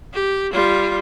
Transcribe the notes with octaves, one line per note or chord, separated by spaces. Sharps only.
G4
G3 F4